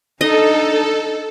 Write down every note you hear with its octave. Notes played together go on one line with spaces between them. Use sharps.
D4 D#4 A4 D#5